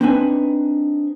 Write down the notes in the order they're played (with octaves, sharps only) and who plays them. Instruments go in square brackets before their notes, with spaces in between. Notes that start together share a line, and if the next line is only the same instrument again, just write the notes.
[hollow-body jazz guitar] C4 D4 D#4 B4 G#5